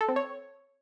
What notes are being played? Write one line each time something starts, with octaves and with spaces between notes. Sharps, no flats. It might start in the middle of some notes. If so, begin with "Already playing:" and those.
A4
C4
C#5